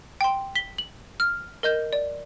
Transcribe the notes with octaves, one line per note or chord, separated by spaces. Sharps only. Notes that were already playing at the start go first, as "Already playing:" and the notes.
G5 C6
B6 G7
F#7
F6
A#4 D#5 G6
D5